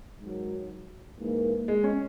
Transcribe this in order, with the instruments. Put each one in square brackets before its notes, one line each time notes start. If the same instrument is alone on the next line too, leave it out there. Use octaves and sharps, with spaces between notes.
[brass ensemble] G#2 D#3 F#3
G#2 E3 A#3
[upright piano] G#3
C#4